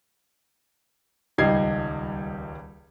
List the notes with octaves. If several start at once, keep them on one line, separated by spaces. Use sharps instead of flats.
D#1 C#2 G3 D#4 G#6 C7